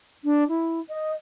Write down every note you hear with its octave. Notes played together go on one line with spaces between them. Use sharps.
D4
E4
D#5